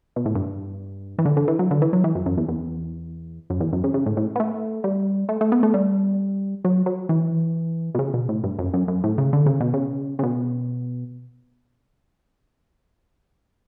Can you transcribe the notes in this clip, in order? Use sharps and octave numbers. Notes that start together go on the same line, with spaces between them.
B2
A2
G2
E3
D3
D3
E3
F#3
D3
E3
F#3
E3
F#2
F#2
E2
E2
F#2
E2
F#2
C#3
C#3
A2
A2
B3
A3
G3
A3
A3
B3
A3
G3
F#3
F#3
E3
B2
C#3
B2
A2
G2
F#2
F#2
F#2
A2
C#3
D3
C#3
B2
C#3
C#3
B2